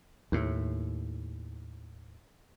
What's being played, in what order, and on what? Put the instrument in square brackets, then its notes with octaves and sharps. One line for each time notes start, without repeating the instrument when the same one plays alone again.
[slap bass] D#2 A2